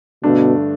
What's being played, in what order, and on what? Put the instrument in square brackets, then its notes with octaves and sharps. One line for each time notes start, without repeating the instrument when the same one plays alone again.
[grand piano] G2 D3 A3 D4 [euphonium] B2